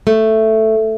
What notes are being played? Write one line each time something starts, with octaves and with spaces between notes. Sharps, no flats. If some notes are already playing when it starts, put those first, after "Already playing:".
A3